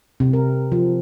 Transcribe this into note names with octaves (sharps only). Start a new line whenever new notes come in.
C3
A#4
F3